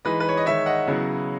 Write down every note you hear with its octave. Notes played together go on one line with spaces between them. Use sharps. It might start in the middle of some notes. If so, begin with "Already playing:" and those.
E3 G#3 D#4 B4 D#5
B4
C#5
D#5
D#3 G#3 D#4 C#5 E5
D#5 F#5
C#3 F#3 B3 E4